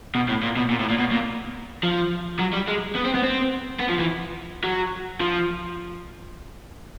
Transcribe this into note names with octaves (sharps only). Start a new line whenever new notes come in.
B2
A2
A#2
B2
A#2
A2
A#2
B2
A#2
F3
F#3
G3
G#3
B3
C4
B3
C4
B3
F3
E3
F#3
F3